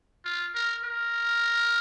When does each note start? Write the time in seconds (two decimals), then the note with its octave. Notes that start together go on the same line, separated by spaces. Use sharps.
0.25 F4
0.54 A#4
0.84 A#4